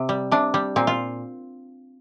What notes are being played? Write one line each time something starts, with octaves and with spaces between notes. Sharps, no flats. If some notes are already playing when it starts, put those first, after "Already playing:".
Already playing: C3
G3
C3 D4
G3
A#2 C4
F4